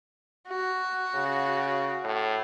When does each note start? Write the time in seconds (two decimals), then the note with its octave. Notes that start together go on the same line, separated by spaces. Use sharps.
0.48 F#4
1.15 C#3
2.04 A2